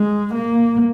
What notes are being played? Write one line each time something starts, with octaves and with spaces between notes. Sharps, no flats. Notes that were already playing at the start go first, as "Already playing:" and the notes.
Already playing: G#3
A#3